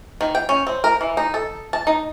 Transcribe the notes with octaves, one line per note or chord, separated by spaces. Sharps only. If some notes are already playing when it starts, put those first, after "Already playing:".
D#3
G5
C#4
C4
A#4
E3
D#4
A4
A5
D#4